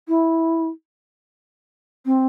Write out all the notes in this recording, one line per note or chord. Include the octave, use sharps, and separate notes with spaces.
E4
C4